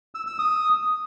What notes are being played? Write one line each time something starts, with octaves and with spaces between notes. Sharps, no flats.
E6
E6
D#6